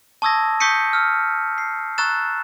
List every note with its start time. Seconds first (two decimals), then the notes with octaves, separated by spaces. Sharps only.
0.22 A5 C#6 D#6 E6 G#6 A#6
0.60 C#6 D#6 G6 B6 C#7 D#7
0.93 E6 F6
1.58 C7
1.98 A#5 C#6 E6 F#6 A6 E7